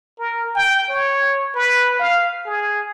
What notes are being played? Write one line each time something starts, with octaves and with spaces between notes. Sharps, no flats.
A#4
G5
C#5
B4
F5
G#4